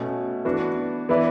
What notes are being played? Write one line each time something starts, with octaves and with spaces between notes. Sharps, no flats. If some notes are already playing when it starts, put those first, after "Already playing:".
Already playing: B2 A3 C#4
E3 B3 D4 F#4
E3 B3 E4 B4 D5